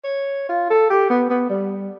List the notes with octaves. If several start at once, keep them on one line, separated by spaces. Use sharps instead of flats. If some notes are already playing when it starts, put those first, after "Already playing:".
C#5
F4
A4
G4
B3
B3
G3